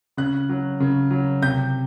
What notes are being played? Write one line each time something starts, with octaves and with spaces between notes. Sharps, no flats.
C#3 F#6
F#3
C#3
F#3
C3 G6